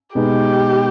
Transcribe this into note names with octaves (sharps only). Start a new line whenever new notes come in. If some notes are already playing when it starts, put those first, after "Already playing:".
B2 G#3 B3 D#4 G4